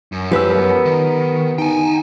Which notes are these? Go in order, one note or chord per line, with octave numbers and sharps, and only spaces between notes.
F#2
F3 G4 B4 E6
B3 A#4
D#3
D#4 G5 G#5